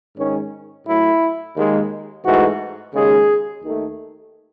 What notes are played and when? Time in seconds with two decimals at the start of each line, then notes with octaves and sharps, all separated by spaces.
0.17 G#2 D#3 G#3 C#4
0.87 A2 F#3 A3 E4
1.56 D#2 D#3 G#3
2.25 G#2 E3 A3 F#4
2.94 D#2 C#3 G#3 G#4
3.63 D#2 D#3 A3